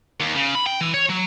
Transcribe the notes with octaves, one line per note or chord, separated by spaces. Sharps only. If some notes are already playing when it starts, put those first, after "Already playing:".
D#2
C#3
B5
G5
E3
C#5
F#3